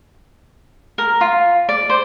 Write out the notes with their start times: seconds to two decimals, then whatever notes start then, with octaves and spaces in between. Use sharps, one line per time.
0.98 A#4
1.21 F4
1.69 D5
1.90 C5